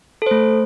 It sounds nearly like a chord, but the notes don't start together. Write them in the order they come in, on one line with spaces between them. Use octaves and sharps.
A4 C5 A3